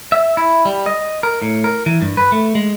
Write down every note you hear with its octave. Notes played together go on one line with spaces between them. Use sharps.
E5
E4
G3
D#5
A#4
A2
A#4
E3
G2
B4
A3
G#3